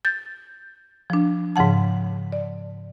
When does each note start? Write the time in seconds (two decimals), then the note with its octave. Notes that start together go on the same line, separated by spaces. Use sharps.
0.05 G6 A6
1.10 F3 D4
1.56 G#2 C#3 F3 F#5 A5
2.32 D5